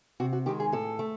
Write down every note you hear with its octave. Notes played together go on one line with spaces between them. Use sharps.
C3 F#4
F#4
D#3 G#3 G4
G#4
A2 A4
A3